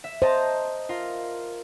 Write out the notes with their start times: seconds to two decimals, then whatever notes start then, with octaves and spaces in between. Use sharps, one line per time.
0.04 E5
0.22 C5 D#5 A5 A#5
0.89 F4 A#4